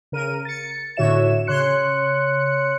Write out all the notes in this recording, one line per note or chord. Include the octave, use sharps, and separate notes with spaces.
C#3 A#4 D#7
A6 C#7
A2 D3 F#4 C#5 E5 E7
C#3 C#5 C6 F#6 C#7